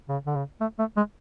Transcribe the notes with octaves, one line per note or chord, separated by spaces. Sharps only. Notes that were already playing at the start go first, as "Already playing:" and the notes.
C#3
D3
C#3
A3
A3
G#3